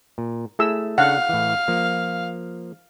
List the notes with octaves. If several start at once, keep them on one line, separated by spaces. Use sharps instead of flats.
A#2
A3 E4 G#4 E6
C#3 D4 A4 F5 F#5
A2 E3
F3 A#3